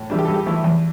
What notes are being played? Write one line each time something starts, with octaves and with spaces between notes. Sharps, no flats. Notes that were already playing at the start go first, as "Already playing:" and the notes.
Already playing: A2
E3 G3 D4
G4
A4
G2
G4
E3 A3 E4
E2